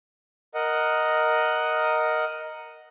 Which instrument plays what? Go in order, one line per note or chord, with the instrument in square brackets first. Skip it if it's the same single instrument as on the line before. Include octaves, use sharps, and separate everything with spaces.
[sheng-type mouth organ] A#4 D#5 F#5